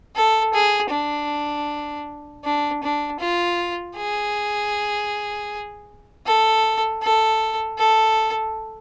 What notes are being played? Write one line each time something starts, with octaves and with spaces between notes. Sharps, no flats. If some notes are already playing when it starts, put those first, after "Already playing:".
A4
G#4
D4
D4
D4
F4
G#4
A4
A4
A4